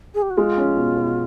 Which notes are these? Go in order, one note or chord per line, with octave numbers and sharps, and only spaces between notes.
G#4
G4
F#4
G#3 F4
C#4
B2
B2